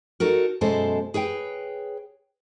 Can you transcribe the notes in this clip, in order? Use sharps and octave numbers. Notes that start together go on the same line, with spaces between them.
D#4 F#4 A4 A#4
F#2 B2 G#3 A4 C5 A5
G#4 B4 C#5 G5